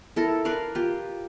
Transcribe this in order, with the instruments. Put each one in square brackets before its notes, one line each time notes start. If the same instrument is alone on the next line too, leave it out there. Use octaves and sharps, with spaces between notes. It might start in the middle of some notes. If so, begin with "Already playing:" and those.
[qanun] E4 A4 A#4
A#4 B4 D5 F5
F4 G4